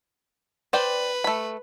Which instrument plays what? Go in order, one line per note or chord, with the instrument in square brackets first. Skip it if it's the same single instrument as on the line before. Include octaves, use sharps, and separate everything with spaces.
[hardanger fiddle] B4 [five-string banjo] C5 D5 G5
[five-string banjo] A3 B5